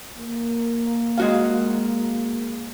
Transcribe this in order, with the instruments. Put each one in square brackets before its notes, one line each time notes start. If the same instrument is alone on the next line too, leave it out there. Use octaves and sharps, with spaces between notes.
[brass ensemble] A#3
[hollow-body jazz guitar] G#3 F#4 F5